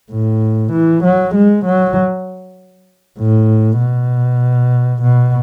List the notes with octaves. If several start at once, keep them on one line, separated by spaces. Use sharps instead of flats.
A2
E3
F#3
G#3
F#3
A2
B2
B2